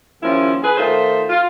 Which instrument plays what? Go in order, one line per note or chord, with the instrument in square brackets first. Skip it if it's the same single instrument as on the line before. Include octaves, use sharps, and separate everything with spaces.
[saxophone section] D#2 F3 C#4 E4
G#4 B4
D#3 A3 F4 C5
F4